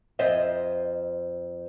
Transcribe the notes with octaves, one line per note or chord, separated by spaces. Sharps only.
F2 C5 D#5 E5